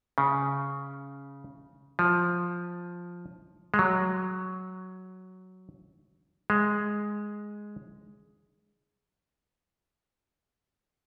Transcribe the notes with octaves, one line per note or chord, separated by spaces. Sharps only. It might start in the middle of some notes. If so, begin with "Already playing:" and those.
C#3
F3
G#3
F#3
G#3